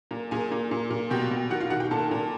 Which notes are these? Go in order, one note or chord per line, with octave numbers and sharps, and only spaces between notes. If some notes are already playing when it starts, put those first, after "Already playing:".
A#2
A#2 G#4 G#5
A#2
A#2
A#2
B2 G4 G5
B2
D#3 F#4 F#5
F4 F5
D#3 F#4 F#5
G4 G5
A#2 A4 A5
A#2